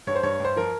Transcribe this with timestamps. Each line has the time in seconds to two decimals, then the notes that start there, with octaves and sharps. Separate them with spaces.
0.07 G2 C#5
0.15 C5
0.23 G2 C#5
0.40 G2 C5
0.56 F3 A#4